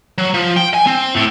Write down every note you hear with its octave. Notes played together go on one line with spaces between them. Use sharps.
F#3
F3
G5
G#5
C4
A2